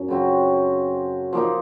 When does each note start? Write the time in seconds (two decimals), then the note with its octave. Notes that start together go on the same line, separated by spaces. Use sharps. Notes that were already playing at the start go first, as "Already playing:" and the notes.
Already playing: F#2
0.08 C#3 F#3 C4 F#4
1.33 F3 A#3 D#4